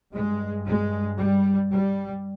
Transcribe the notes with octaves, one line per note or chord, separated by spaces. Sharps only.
G2 G#3
G#3
G3
G3